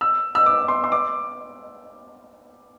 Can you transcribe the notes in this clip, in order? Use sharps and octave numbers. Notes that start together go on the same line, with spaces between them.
E6
E6
D6
C6
C6
D6